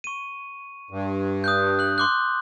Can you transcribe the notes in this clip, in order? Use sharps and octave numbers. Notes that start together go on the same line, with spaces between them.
C#6 D#7
G2
D#6 F#6 G6
F#6 F#7
C6 D6 F#6